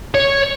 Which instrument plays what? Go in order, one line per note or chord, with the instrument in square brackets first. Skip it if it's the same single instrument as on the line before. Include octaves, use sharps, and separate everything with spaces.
[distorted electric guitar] C#5